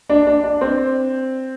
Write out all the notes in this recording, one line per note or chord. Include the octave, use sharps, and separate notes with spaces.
D4
D4
D4
C4